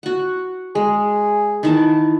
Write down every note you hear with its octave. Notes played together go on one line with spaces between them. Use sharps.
F#4 F#5
G#3 G#4
D#3 E3 A5